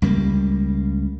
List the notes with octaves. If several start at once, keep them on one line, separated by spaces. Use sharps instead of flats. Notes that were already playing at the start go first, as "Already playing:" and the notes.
C#2 G3 A#3